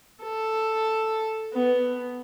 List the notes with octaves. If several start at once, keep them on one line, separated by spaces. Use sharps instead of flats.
A4
B3